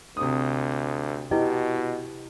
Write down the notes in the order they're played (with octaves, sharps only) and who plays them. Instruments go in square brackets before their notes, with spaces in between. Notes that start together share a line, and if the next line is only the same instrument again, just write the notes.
[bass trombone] D2 [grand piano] C3 D#6
[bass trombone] B2 [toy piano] E4 B4 D#5 [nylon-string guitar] G4